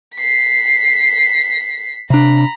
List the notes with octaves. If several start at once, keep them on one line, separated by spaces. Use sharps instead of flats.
B6 C7
C3 D4 A#5 B5